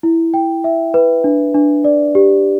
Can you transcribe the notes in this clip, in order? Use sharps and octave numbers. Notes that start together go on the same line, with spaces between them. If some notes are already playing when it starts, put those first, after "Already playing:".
E4
G5
E5
B4
D4
D4
D5
G4